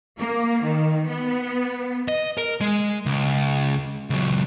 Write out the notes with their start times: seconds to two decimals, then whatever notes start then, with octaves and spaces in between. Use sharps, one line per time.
0.18 A#3
0.63 D#3
1.07 B3
2.08 D#5
2.38 A#4
2.61 G#3
3.06 C#2
4.10 C#2 F#3